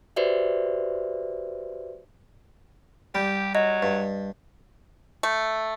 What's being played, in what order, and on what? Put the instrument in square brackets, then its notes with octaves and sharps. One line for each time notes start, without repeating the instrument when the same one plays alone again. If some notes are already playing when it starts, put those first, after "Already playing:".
[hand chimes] F#4 G4 B4 C5 D5 E5
[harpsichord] G3 [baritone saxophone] G4
[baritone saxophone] F#3 [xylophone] D#5
[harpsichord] G2
[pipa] A3